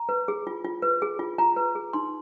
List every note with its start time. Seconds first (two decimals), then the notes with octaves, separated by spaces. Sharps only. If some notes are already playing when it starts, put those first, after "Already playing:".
Already playing: A#5
0.09 B4
0.28 G#4
0.47 F4
0.65 F4
0.82 B4
1.02 G#4
1.19 F4
1.38 F4 A#5
1.56 B4
1.75 G#4
1.93 D#4 C6